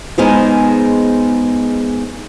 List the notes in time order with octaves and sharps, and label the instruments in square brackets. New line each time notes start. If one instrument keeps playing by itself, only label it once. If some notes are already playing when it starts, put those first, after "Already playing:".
[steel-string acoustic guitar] G#3 B3 D#4 G#4 A#4 C5